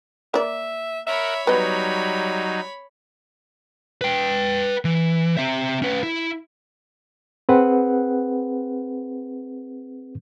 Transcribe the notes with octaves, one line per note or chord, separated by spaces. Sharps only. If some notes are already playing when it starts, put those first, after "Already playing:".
A#3 D5 E5
A#4 C#5 E5 F#5 B5
F#3 G3 B3 D#4 D#5
B4 G5
E3
C4 E5
C#4 B4
E4
C4 G#4 B4 F#5